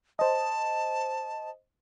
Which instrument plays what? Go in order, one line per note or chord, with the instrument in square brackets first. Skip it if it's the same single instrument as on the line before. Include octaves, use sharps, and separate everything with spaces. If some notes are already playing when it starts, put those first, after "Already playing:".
[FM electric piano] C5 D#5 [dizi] A5